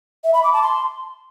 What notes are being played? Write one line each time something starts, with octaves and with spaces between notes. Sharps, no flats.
E5
B5
D6
A5
C6